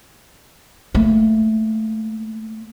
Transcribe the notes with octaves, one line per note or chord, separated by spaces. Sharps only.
A3 A#3